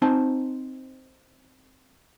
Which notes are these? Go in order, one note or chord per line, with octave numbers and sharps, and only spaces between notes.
C4 D#4 C5 A5